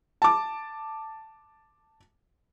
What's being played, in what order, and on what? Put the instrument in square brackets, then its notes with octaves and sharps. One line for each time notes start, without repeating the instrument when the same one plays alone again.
[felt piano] A5 D6